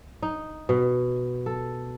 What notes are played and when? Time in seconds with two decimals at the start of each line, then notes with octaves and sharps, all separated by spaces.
0.22 D#4
0.69 B2
1.46 A4